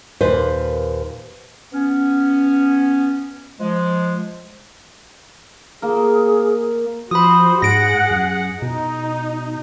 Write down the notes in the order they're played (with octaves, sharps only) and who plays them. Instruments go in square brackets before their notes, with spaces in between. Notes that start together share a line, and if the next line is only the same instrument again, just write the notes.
[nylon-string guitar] D#2 A#2 B4 C5
[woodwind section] B3 C#4
F3 G#3
[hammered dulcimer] A#3 A#4 [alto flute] G#4
[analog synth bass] F3 [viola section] F#4 C5 [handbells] B5 D#6
[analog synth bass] G#2 [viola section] G#4 F#5 [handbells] A#6 D7
[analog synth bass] F#2
[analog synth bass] B2 [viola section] D#4